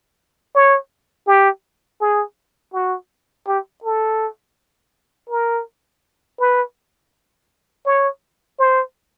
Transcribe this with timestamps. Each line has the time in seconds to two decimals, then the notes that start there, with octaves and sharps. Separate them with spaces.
0.55 C#5
1.27 G4
2.01 G#4
2.74 F#4
3.48 G4
3.84 A4
5.30 A#4
6.40 B4
7.86 C#5
8.59 C5